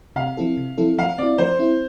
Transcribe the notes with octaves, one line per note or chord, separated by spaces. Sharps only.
C3 F5
F3 C4 E4 A4
C3
F3 C4 E4 A4
F3 F5
C4 E4 D5
F3 C5
C4 E4